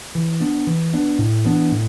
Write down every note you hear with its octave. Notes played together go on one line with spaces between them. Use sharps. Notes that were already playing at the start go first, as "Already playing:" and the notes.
E3
B3 D4
E3
B3 D4
A2
E3 B3 D4
A2